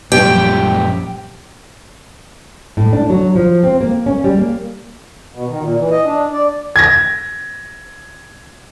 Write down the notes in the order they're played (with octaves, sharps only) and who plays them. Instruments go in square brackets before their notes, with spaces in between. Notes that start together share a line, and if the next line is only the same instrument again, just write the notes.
[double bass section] A#1 F3 G3 [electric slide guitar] F#2 A#2 [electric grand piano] G4 [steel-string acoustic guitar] G5
[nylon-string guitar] A2
D4
F#3
F3
C4
A#3
C#4
G3
A#3
[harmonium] B2
D#3
A#2
E3
D#5
D4
D5
[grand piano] G#6 A#6